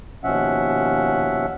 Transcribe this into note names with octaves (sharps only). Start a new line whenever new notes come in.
D#2 B2 F3 C#4 E5 F#5